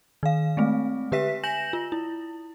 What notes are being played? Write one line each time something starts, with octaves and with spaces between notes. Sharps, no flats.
D#3 F5
G#3 A3 C4
D3 G4 B4 E5 B6
G#5 G6 A#6 E7 F#7
F4
E4